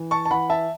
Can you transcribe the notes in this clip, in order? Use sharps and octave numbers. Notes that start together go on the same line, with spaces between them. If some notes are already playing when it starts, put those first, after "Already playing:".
Already playing: E3
A5 C#6
A5
E3 F#5 B5
E5 A5